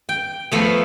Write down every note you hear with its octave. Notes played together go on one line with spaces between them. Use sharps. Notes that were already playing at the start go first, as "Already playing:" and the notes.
G5
F3 A3 B3